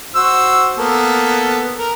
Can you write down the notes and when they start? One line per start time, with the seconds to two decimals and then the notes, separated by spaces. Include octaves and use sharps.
0.15 F#4 C5 E6
0.78 A#3 B3 A4
1.78 A#4